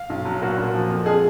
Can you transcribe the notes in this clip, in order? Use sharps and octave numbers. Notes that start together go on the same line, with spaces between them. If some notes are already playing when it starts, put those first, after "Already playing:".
Already playing: F5
B1
F#3
A#2 F#4
A#2
F3
F2
G#3 G#4